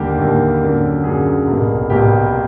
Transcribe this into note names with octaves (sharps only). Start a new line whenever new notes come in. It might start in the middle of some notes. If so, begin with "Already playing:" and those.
Already playing: D#2 D3 G3 A#3 G4
D#2 D3 G3 A#3
F#2 D3 F#3 A#3
F#2 D3 F#3 A#3 G#4
C2 B2 G3 A#3
C2 B2 G3 A#3 G4